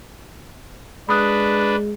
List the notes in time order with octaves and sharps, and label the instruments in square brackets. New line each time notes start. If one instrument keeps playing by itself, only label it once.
[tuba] G#3 [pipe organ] D4 B4 [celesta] B5 D#6 F#6